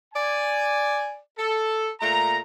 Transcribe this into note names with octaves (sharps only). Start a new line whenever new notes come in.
D5 G#5
A4
A#2 A3 A#5